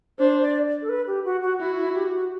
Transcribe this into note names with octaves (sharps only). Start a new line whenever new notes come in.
D4 C5
D5
A4
B4
G4
F#4
F#4
E4 F#4
E4
G4
F#4